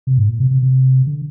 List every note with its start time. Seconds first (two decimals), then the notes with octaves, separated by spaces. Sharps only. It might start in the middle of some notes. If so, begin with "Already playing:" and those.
0.07 C3
0.18 G#2
0.29 A#2
0.40 C3
0.51 C3
0.62 C3
1.07 D3